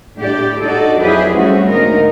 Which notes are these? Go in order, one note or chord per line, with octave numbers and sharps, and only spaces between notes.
A2 D4 G4 D5
D#4 F#4 A4 D5
F2 F#3 E4 G4 G#4 B4
G3 A3 C4 C#4 F#4
D2 G#2 A#3 D#4 A#4